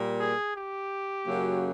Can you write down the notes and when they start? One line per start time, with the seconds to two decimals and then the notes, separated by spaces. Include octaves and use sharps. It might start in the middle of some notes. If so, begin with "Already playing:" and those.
Already playing: A#2 G3 A#3
0.19 G#4
0.55 G4
1.25 F#2 C#3 F#3 A#3